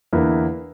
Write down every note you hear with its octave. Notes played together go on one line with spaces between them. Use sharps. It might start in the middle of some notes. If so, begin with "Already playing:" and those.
E2 D3 A#3 E4 B4